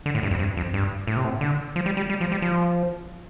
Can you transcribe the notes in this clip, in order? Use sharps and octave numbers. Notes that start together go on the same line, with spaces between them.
D3
A2
G2
F2
G2
F2
G2
A2
C3
A2
D3
F3
G3
G3
G3
F3
G3
F3